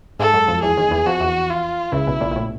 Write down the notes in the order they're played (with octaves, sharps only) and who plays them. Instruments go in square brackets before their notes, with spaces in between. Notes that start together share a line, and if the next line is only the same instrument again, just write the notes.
[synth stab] G#2 G#3 [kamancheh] A4
[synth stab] F#2 F#3
F2 F3
[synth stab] E2 E3 [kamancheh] G#4
[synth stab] D#2 D#3
E2 E3
[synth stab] F2 F3 [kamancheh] F#4
[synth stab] E2 E3
[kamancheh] F4
[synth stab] C#2 C#3 [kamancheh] E4
[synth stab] B1 B2
A#1 A#2
A#2
A2